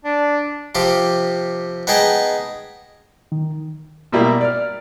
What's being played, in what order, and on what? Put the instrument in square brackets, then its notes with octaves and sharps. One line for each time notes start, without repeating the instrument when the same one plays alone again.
[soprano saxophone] D4
[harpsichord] C3 F3 G4
B3 D#4 G#4 G5 A5 B5
[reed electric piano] D#3
[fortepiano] B2 G3 A#3 E4
D5 F6